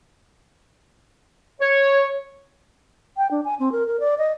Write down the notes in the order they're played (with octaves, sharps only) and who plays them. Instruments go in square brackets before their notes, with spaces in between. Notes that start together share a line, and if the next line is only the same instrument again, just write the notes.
[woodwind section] C#5
[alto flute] G5
D4
G#5
C4
A#4
A#4
D5
D#5